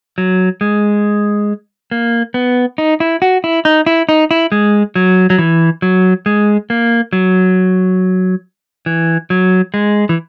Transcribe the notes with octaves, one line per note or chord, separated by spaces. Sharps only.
F#3
G#3
A#3
B3
D#4
E4
F#4
E4
D#4
E4
D#4
E4
G#3
F#3
F#3
E3
F#3
G#3
A#3
F#3
E3
F#3
G#3
E3